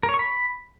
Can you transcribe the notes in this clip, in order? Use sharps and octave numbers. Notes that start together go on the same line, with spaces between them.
A#4
C#5
C#6
B5